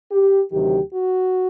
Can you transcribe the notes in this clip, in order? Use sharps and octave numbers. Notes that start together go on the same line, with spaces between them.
G4
D2 C3 D#3 F#3 G4
F#4